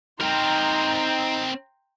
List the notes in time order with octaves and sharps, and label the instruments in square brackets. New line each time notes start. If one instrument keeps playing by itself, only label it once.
[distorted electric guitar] C4 A#4 [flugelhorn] D#4 [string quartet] G5 A#5 C6